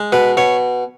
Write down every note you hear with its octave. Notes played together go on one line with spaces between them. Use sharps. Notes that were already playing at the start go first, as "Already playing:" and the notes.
Already playing: G#3
B2 B4
B2 C#5